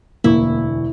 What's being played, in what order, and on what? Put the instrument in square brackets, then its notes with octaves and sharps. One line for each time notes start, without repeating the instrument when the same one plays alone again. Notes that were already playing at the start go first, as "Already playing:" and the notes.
[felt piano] E1 D2 C#6 [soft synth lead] A#3 [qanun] E4